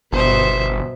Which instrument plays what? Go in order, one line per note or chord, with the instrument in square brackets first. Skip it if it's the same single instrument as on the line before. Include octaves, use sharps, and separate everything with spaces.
[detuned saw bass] G1 [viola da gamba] B2 B3 [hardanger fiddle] C5 E5